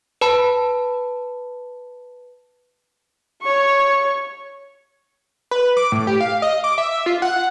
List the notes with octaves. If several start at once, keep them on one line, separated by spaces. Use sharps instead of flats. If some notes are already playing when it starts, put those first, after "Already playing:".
B4 A5 B5
C#5 C#6
B4
D6
A2
G4
F5
D#5
D6
E5
F4
F#5